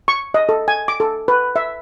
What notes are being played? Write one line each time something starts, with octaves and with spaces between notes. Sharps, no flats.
C#6
D#5
A4
G#5
D6
A4
B4
E5